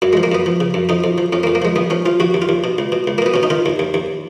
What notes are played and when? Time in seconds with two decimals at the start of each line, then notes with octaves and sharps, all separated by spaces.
0.02 F#2 F#3
0.13 F3 G#3
0.23 A#3
0.32 F#2 B3
0.46 F3
0.61 C#3
0.74 F#2
0.89 F2 D#4
1.04 F2
1.18 F3
1.33 F2 C#4
1.43 A#3
1.47 F2
1.55 A#3
1.62 F3 G#3
1.76 D#2 B3
1.90 F3 C#4
2.06 F3 F4
2.20 D#2 F#4
2.34 D#2
2.42 F4
2.49 D#2
2.64 B2
2.78 C#2
2.92 B2
3.07 C#2
3.18 A#3
3.22 B2 B3
3.34 B2 C#4
3.43 D#4
3.50 D#3 F4
3.66 D#2
3.79 D#2
3.94 D#2